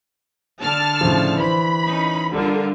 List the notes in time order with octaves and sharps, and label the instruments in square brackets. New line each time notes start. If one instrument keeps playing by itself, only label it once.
[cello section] D3 [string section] A5 F6
[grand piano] A2 C#3 F3
[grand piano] E3 C5 [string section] B5
[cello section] C#4 D#4
[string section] D3 [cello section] G3 F4 [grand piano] A4 A#4